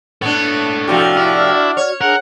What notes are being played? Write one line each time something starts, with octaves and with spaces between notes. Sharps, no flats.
B3 D4 A4 C#5
A2 C3 F3 F#4 G4 D5 F6
D4 E4
C#5
D4 G#4 A#4 F#5